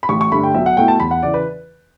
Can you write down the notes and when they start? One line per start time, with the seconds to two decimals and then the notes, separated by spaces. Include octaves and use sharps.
0.03 B5
0.09 A1 C#6
0.21 C#6
0.32 G2 D3 A3 B5
0.43 G5
0.55 B1 E5
0.66 F#5
0.77 B2 A3 E4 G5
0.88 A5
1.00 E2 B5
1.11 F#5
1.23 C#3 E3 D5
1.34 B4